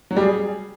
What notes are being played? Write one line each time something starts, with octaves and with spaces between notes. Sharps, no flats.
F#3
G3
G#4